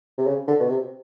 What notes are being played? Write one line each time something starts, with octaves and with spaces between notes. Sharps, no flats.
C3
C#3
D3
B2
C3